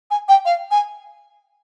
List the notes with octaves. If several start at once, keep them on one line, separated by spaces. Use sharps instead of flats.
G#5
G5
F5
G#5